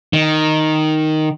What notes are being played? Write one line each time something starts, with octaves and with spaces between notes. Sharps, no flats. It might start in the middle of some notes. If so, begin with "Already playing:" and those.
D#3